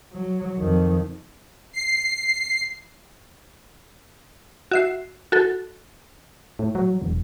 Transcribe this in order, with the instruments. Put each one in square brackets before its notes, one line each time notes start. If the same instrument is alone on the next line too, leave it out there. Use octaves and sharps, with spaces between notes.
[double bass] F#3
F2 D#3
[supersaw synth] C7
[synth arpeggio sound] F#4 E5 C7
F#4 A4
[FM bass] A2
F#3
E1